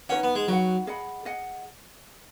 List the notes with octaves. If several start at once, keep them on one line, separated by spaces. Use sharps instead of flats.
C#4 D#4 F#4 B4 F#5
B3
G#3
F#3 D#4 F#4 B4 F#5
G#4 D#5 F#5 B5
G#4 D#5 F#5